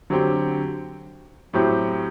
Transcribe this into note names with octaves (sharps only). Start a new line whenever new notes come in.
D3 F#3 C4 G4
A2 F#3 C4 G4